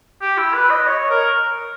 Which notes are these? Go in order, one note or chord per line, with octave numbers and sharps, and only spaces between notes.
G4
E4
B4
D#5
C#5
A#4